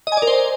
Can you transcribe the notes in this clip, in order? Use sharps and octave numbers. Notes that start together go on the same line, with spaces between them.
D#5
G#5
D5
A#4
C5